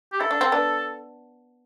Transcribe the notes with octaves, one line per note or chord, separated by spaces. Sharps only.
G4
E4 A4
D4
C4
B3 D4